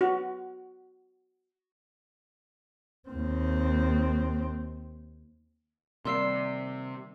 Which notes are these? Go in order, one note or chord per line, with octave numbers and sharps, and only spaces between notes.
F#4
D#2 C4
C3 D#3 G3 A#3 C6 E6 C7